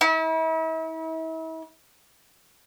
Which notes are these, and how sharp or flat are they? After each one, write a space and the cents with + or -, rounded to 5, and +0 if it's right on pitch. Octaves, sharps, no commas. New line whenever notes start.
E4 -40